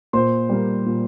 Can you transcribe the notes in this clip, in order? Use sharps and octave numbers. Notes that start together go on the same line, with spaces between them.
A#2 C5 C6
G3 A#3
A#2